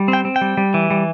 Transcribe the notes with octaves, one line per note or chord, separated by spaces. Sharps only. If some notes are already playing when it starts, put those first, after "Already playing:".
Already playing: G3
C4
G5
C4
G5
G3
G3
E3
G3